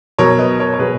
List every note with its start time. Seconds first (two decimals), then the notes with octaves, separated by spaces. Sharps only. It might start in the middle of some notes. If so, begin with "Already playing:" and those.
0.18 B2 F#3 A#4 C#5
0.38 B4 D#5
0.59 A#4 C#5
0.74 C#5
0.79 B2 F#3 G#4 B4